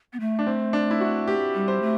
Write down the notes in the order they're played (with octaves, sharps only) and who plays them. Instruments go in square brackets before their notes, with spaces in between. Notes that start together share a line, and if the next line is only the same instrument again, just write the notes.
[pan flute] B3
A3
[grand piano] D4
C4
D4
E4
F#4
G4
[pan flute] G3
[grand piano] C5
[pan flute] A3